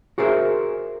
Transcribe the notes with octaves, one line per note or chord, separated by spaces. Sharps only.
F#4 G#4 A#4 C5 E5